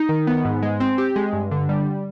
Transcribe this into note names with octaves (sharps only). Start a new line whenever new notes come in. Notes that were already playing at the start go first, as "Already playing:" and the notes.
Already playing: D#4
D#3
B3
G#2
G#3
C4
G4
G#3
G2
D3
G3